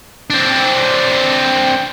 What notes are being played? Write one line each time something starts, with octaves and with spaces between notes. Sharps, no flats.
C4 D4